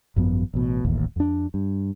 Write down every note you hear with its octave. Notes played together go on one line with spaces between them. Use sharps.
G#1 F#2 F3 B3
A1 B2
D1 A1 D#2
F2 D4
G2